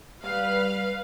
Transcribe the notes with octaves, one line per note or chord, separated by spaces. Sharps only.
G3 B4 F5